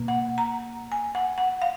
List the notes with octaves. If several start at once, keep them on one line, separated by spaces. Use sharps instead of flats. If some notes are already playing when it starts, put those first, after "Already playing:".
Already playing: B2 A#3
F#5
A#5
G#5
F#5
F#5
F5